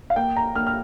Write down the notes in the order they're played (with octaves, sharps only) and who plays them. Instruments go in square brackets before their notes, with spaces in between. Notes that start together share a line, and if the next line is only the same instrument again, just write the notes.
[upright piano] F5
A#3 G5
A#5
A#3 F6
F6